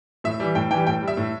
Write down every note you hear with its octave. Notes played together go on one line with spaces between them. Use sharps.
A2 E5
E3 G3
A2 G5
E3 G5
G3
A2 G5
G3
E5
A2